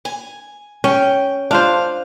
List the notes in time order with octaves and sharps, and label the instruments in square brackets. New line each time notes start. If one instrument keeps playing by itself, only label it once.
[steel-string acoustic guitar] G#5
[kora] C#4 [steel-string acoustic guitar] G5
[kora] D4 F4 C5 [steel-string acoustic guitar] F5